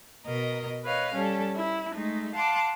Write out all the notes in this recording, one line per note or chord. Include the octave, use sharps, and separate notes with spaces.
B2 A#4 D#5
B4 C#5 D#5 F5
G3 C#4 A4
E4
G#3 A3 D#4
F5 F#5 A5 C6 D6